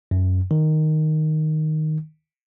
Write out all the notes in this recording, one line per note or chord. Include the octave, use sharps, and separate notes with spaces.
F#2
D#3